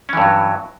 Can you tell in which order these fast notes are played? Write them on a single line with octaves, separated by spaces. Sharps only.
C#4 E3 G2 F#3